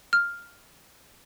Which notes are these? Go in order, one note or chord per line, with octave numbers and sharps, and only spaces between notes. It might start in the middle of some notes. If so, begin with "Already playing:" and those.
F6